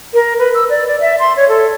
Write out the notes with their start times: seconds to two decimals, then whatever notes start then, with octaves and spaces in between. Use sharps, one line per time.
0.14 A#4
0.39 B4
0.54 E6
0.70 D5
0.87 D5
1.01 E5
1.19 C6
1.37 C#5
1.49 A4